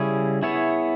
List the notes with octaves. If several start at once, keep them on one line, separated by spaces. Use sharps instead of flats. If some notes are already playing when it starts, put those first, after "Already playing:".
Already playing: C#3 G3 C#4 E4 G#4
B3 E4 G#4 C#5 E5